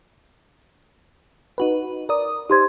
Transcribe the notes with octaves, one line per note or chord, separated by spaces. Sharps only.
D#4 F#4 B4
A#4 D5 D#6
D#4 G4 C5 C6 G#6